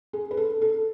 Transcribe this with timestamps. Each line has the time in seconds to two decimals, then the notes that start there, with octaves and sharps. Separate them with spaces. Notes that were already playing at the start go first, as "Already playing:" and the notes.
0.13 G#4
0.31 B4
0.37 A4
0.62 A4